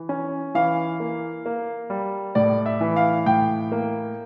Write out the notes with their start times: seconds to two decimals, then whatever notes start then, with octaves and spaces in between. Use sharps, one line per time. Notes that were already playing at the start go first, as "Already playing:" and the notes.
Already playing: E3
0.09 C#4
0.55 E3 F5
1.00 A#3
1.46 A#3
1.90 G3
2.35 A2 D5
2.66 E5
2.81 E3
2.96 F5
3.26 A2 G5
3.72 A#3